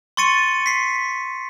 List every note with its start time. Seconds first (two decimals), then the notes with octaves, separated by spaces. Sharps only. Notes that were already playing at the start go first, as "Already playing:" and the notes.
0.17 C6 C#6 A6 C#7 D#7
0.66 B6 C7